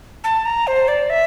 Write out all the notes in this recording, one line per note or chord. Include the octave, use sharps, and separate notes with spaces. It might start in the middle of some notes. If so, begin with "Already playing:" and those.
A5
A#5
C5
D5
E5